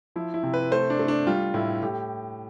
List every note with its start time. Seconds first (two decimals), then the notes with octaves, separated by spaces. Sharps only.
0.16 F3 E4
0.34 E4
0.43 C3
0.54 B4
0.71 A3 C5
0.90 D4
0.99 A3
1.08 D4
1.27 G3 F4
1.54 A2 E4
1.83 A2 G4